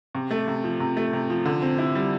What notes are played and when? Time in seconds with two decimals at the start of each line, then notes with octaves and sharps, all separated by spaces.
0.15 C3
0.31 A3
0.48 C3
0.64 F3
0.80 C3
0.97 A3
1.13 C3
1.30 F3
1.46 D3
1.62 C4
1.78 E4
1.95 G3